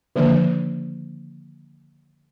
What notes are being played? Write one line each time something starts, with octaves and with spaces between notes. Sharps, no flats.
D3 D#3 F3 A#3 D4